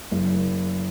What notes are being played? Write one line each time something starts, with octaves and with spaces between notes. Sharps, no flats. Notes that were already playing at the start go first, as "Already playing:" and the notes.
F#1